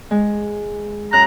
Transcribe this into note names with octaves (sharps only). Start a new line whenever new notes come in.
G#3
F#2 A#5 F#6